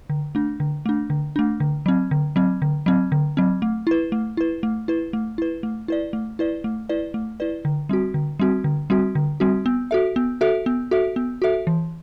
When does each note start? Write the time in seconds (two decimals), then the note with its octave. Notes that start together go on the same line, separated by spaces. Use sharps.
0.10 D3
0.35 A3 D4
0.60 D3
0.86 A3 D4
1.10 D3
1.36 A3 D4
1.60 D3
1.86 F#3 C4
2.11 D3
2.36 F#3 C4
2.62 D3
2.86 F#3 C4
3.12 D3
3.37 F#3 C4
3.62 A3
3.87 E4 B4
4.12 A3
4.37 E4 B4
4.63 A3
4.88 E4 B4
5.13 A3
5.38 E4 B4
5.63 A3
5.88 E4 B4 D5
6.13 A3
6.39 E4 B4 D5
6.64 A3
6.89 E4 B4 D5
7.14 A3
7.40 E4 B4 D5
7.65 D3
7.89 G3 C4 F#4
8.14 D3
8.39 G3 C4 F#4
8.64 D3
8.90 G3 C4 F#4
9.15 D3
9.40 G3 C4 F#4
9.66 B3
9.91 F#4 A4 E5
10.16 B3
10.41 F#4 A4 E5
10.66 B3
10.91 F#4 A4 E5
11.16 B3
11.42 F#4 A4 E5
11.67 E3